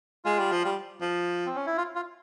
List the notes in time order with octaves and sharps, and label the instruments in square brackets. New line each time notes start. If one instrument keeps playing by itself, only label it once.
[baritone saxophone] G#3 [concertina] F4
[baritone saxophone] G3
F3
G3
F3
[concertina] C4
C#4
E4
F4
F4